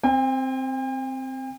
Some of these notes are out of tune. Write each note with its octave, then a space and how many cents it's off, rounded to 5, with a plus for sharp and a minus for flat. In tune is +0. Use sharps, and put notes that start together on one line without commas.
C4 +0 G5 +45